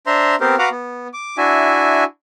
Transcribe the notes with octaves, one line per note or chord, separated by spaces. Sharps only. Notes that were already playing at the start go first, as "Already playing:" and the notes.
D4 C5 E5 A#5 C6
B3 C4 G4 A#4 C5
F#4 B4 F5 F#5 A#5 D6
B3
D6
D4 E4 F#4 E5 G#5